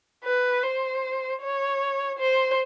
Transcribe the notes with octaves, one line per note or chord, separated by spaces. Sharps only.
B4
C5
C#5
C5